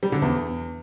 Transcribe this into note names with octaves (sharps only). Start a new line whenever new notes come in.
G3
D3
E2